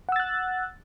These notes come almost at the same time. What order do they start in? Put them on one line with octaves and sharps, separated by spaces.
F#5 E6 A6 F#6